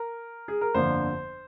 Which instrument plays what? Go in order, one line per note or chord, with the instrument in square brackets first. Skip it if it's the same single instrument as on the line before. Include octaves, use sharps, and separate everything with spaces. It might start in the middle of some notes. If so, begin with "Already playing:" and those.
Already playing: [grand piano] A#4
G#4
A#4
G1 F2 D3 F3 A#3 C5